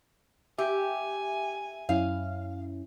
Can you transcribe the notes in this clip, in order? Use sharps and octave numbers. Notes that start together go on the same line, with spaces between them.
G4 E5 G#5
F#2 C#4 E4 F5